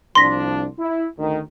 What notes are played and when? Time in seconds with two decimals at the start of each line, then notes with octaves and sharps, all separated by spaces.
0.15 C2 F3 D4 C6 A#6 B6
0.78 E4
1.18 D2 D#3